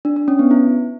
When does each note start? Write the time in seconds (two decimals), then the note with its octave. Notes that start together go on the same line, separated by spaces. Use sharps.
0.05 D4
0.16 D4
0.28 C#4
0.39 B3
0.51 E4